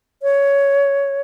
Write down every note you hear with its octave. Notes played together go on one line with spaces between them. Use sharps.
C#5